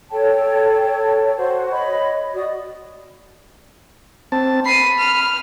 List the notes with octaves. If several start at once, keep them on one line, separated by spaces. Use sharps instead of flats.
A4 C#5 G5 A5
F#4 C5
C#5 D#5 B5
F#4 D5 D#5 D#6
C4 A5
B5 C7 D#7
F6